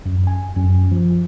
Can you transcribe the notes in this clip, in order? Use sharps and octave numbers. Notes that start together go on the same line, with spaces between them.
F#2
G#5
F#2
F3